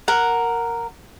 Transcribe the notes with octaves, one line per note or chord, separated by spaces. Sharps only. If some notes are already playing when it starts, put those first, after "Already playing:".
A#4 F#5